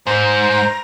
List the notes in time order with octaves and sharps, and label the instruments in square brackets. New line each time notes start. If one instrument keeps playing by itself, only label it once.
[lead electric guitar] G#2 [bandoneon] C5 [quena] A#5